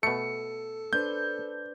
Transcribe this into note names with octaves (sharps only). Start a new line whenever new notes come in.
B2 A3 A4 C#7
D4 B4 C5 G6